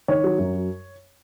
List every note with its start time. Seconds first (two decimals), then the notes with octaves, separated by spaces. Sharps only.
0.08 D#3 C#5
0.24 F#3
0.38 F#2